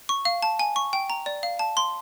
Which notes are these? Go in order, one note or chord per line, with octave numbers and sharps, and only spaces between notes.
C#6
F5
A5
G#5
C#6
G5
A#5
D5
F5
A5
C6